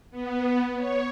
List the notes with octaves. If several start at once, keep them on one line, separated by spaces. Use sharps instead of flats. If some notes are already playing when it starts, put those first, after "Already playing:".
B3
C#5